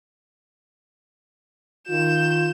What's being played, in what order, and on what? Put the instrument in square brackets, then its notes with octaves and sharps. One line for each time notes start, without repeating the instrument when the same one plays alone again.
[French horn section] D#3 F4 [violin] G6 E7